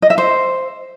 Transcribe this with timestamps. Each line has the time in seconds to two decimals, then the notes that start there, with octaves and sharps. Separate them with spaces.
0.02 D#5
0.10 E5
0.18 C5